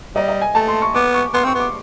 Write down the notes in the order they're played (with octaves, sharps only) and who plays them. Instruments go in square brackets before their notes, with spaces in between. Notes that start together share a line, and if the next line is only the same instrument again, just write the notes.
[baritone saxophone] G3 [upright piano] D#5
[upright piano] D#5
G#5
[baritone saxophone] A3 [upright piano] A5
[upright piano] C6
C#6
[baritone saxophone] B3 [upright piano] D6
[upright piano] C#6
[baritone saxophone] B3 [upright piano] C6
[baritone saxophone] C4 [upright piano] C#6
[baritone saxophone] B3 [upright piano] D6